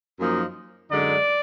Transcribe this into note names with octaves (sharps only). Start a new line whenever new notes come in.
F#2 F3 A#3 D#4
F#2 D3 G#3 D#4 D5